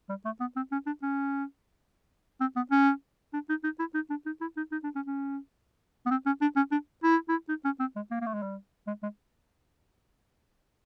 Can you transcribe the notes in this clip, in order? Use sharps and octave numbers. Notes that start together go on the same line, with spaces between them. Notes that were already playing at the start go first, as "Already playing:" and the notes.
G3
A3
B3
C4
C#4
D4
C#4
C4
B3
C#4
D4
D#4
D#4
E4
D#4
D4
D#4
E4
D#4
D#4
D4
C#4
C#4
B3
C4
C#4
D4
C#4
D4
E4
E4
D#4
C#4
C4
G#3
A#3
A#3
A3
G#3
G3
G#3
G#3